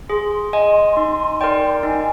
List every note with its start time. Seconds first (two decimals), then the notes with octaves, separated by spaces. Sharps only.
0.09 G#4 C6
0.53 D#5 G#5
0.97 D#4
1.41 A#4 D5 G5
1.83 D#4 G#5